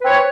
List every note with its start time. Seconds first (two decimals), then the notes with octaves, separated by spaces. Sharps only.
0.01 B4
0.04 C4
0.07 C#5